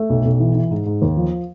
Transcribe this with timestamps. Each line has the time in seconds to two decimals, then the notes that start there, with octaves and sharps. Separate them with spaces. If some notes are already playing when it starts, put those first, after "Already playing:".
Already playing: A3
0.10 B1
0.25 B1
0.40 E3
0.55 E3
0.71 G#2
0.86 G#2
1.02 D#2
1.17 F3